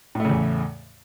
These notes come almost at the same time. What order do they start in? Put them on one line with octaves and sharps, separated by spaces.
A2 A3 C#3 E2